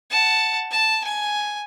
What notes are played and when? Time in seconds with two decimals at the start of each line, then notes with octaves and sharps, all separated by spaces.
0.10 F#5 A5
0.71 A5
1.04 G#5